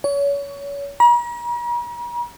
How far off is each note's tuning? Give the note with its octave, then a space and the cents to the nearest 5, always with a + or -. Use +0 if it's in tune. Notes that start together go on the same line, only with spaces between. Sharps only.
C#5 +30
A#5 +45